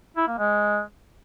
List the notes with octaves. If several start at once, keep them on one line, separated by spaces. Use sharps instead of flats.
E4
A#3
G#3